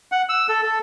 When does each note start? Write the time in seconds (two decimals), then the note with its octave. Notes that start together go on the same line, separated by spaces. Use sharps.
0.12 F#5
0.29 E6
0.49 A4
0.62 A4